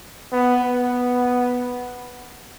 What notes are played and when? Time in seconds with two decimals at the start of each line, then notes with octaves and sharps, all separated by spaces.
0.32 B3
0.64 B3